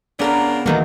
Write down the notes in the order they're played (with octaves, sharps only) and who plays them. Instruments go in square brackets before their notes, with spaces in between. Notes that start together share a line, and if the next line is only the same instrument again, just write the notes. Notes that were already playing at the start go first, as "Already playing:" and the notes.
[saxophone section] C#3 A#3 D4 [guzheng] B3 A#4 B4
[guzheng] E2 D#3 F#3 [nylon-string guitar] A#3 B3